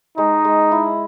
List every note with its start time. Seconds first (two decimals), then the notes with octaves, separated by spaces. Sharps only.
0.18 G#3 D#4
0.45 G#3
0.72 E4